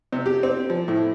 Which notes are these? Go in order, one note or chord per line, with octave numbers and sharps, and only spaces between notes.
C3
G4
C4
F3
A2